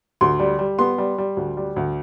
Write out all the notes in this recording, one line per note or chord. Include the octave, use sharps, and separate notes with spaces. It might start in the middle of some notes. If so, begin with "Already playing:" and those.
D2 C6
G3
G3
B3 C6
G3
G3
D2
G3
D2